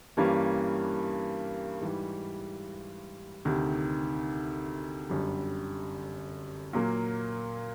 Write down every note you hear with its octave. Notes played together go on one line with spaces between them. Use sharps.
G2 E3 G3 A#3 C#4
G#2 E3 G3
D2 C3 D#3
G1 F#2 D3 G3
A#2 F#3 A#3